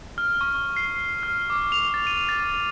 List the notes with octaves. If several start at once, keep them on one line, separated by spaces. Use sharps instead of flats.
F6
C#6
C7
F6
D6
F7
A6
D#7
A6